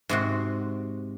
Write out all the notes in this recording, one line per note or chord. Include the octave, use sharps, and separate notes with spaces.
G#2 C3 F#4